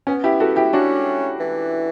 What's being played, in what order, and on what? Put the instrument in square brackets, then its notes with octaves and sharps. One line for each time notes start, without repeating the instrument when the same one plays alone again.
[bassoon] B3 [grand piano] C#4
[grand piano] E4 G4
F#4 A4
E4 G4
[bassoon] C#4 [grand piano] D4 F#4
[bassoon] E3